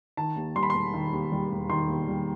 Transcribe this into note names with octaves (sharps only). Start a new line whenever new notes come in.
D#3 A5
D#2
G3 C6
B5
E1 C6
D#3
D#2
G3
E1
D#3 C6
D#2
G3